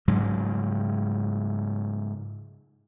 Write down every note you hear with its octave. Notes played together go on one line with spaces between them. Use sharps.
G#2 C#3 F#3